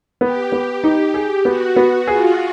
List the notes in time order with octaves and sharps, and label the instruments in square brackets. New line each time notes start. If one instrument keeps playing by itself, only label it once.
[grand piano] B3 [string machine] G4
[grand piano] B3
D#4
G#4
[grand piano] B3 [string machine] F#4
[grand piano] B3
[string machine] F4 [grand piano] G#4